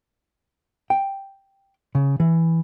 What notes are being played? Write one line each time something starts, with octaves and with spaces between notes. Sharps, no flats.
G5
C#3
E3